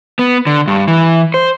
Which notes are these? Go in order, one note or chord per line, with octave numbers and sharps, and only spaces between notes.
B3
D3
G2
E3
C5